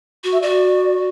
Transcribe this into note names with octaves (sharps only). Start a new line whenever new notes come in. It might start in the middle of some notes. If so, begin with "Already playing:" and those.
F#4
E5
F#4 D5